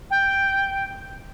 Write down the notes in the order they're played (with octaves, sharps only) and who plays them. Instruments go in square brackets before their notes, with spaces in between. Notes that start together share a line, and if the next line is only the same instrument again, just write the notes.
[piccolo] G5